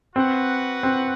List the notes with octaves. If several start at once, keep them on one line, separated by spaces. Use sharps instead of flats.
C4 F#4 B4 F#5
C4